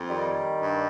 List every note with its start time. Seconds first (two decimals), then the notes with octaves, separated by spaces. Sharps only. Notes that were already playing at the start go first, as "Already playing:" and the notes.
Already playing: F2
0.09 D#3 G3
0.63 G2